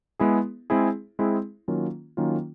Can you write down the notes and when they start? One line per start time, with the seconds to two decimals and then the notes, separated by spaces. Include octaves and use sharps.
0.20 G#3 B3 E4 G#4
0.70 G#3 C4 E4 G#4
1.19 G#3 C4 E4 G#4
1.68 D#3 F#3 A#3 C#4 F4
2.17 D#3 F#3 A#3 C#4 F4